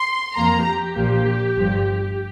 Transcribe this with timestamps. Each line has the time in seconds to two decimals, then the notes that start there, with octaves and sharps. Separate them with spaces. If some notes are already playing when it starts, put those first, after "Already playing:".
Already playing: C6
0.36 F2 F3 A#3 A#5
0.66 G4
0.96 A#1 A#2 F3 A#3
1.56 G1 G2 F3